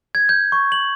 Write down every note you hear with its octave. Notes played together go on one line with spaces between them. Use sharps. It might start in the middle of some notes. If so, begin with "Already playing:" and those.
G#6
G6
C#6
F#7